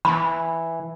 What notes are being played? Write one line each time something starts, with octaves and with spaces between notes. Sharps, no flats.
E3 B5